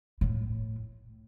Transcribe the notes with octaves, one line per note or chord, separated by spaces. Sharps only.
A2